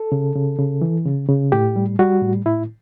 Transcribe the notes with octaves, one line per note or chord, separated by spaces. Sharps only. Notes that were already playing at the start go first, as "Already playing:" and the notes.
Already playing: A4
C#3
C#3
C#3
E3
C#3
C#3
A2 G4
G3
G3 F#4
A2
A2 E4